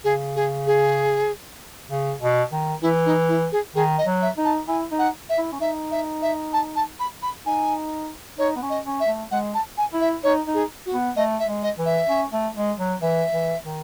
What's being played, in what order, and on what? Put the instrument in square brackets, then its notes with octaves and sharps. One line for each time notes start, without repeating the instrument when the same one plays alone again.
[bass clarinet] C#3 [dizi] G#4
[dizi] G#4
G#4
[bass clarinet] C#3
B2
D#3
[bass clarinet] E3 [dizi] E4
[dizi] D#4
E4
G#4
[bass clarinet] D#3 [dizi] G#4
[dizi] D#5
[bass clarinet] F#3
[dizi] E5
[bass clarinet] D#4
[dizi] A5
[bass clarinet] E4 [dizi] G#5
[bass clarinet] D#4
[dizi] F#5
E5
[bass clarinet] E4
C#4
[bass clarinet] D#4 [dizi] E5
[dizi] E5
E5
A5
A5
B5
B5
[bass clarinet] D#4 [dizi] G#5
[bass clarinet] D#4 [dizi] C#5
[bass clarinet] B3
C#4
[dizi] D#5
[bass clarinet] C#4
[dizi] E5
[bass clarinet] A3
[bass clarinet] G#3 [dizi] F#5
[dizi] A5
G#5
[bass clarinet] E4
[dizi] E5
[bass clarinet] D#4 [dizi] C#5
[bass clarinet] D#4
[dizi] G#4
F#4
[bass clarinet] B3
[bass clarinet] A3 [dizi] D#5
[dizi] E5
[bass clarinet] G#3
[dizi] D#5
[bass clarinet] E3
[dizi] E5
[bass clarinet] C#4
A3
G#3
F#3
[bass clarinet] E3 [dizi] E5
[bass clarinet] E3
D#3